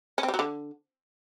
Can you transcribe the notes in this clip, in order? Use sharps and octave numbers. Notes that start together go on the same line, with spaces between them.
C#4
C4
G3
F#3
D3